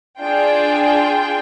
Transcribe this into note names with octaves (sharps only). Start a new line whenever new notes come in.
D4 F4 G#4 G5